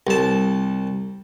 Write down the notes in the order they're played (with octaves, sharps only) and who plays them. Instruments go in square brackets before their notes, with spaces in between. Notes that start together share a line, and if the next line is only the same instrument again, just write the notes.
[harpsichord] C2 A5